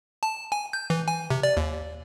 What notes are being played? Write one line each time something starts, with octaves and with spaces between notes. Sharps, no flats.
A5
G#5
G6
E3
G#5
C3
D5
D#2